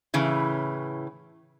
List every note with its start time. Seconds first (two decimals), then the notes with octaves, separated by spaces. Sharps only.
0.14 A2 C#3 E3